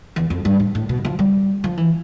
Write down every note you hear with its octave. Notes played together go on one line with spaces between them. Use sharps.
E2
F2
G2
A2
A2
B2
F3
G3
F3
E3